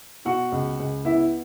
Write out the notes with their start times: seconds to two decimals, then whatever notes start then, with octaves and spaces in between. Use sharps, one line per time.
0.25 B2 F#4 F#5
0.52 C#2
0.79 C#2
1.05 B3 E4 E5